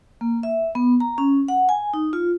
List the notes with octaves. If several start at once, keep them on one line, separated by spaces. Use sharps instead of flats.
A#3
E5
B3
A#5
C#4
F#5
G#5
D#4
F4